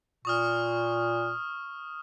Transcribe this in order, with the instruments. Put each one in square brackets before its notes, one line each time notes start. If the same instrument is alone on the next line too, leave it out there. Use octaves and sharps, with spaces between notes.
[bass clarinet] A#2 [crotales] C#6 D#6 F6